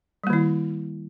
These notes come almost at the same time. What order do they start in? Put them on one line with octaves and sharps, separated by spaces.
G3 A#3 D#3 E4